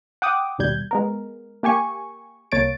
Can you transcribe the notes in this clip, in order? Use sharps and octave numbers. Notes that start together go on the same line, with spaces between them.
F#5 G5 D6 D#6
G#1 D#2 B2 G3 G6 G#6
G#3 B3 A#4
A#3 G4 G#5 C#6
C2 A#3 C#5 A6 D7